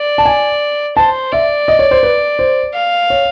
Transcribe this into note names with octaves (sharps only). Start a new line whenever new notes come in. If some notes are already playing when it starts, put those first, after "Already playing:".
Already playing: D5
A5
G#5
C5 A5
D5 E5
D#5
C#5
C5
B4
C5
F5
C#5